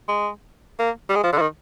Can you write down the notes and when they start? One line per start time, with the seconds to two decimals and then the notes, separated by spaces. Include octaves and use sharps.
0.09 G#3
0.79 A#3
1.09 G3
1.15 G#3
1.24 F3
1.33 D3
1.38 F3
1.41 D#3